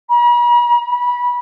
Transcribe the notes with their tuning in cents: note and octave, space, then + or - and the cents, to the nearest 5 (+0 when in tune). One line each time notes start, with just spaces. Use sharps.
B5 -45
B5 -25